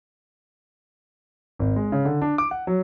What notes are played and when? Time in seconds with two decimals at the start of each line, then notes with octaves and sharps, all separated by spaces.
1.59 G#1
1.76 G#3
1.92 C#3
2.05 D3
2.22 D4
2.38 D6
2.51 F#5
2.67 F#3